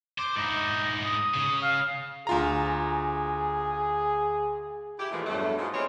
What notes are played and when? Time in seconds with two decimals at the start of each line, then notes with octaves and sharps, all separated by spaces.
0.18 C5 D6
0.37 G#2 D#4 E4
1.02 D#6
1.34 C#3
1.62 F5
2.27 D2 F4 G#4 A#5
4.99 E4 G4
5.12 A#2 E3 F3 G#3 A3
5.25 E2 G2 F#3 G3 A3
5.57 G#2 F3 G#3
5.73 B3 C4 E4 F4 G#4 C#5